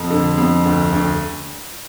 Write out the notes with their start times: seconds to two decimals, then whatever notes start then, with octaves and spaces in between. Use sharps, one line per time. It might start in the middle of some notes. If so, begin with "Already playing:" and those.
Already playing: F2
0.10 D3
0.38 F2
0.65 D2
0.92 D2